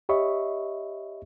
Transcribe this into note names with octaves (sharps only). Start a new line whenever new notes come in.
G4 C#5 D#5 E5 B5 C#6